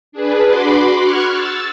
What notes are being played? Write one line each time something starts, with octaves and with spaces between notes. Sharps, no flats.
D4 G#4 B4
F#4 B5 C6 D6
C#6 F6 F#6 G#6
E6 A6